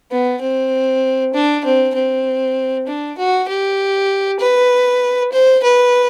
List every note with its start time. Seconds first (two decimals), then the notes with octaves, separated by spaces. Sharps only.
0.11 B3
0.41 C4
1.34 D4
1.65 C4
1.94 C4
2.87 D4
3.18 F#4
3.48 G4
4.40 B4
5.32 C5
5.63 B4